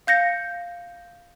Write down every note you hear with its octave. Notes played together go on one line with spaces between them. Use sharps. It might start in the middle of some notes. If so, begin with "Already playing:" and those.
F5 G6 A#6 C#7